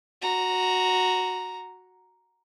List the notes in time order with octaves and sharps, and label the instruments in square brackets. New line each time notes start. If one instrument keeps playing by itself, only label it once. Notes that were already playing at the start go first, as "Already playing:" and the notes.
[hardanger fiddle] F#4 A#5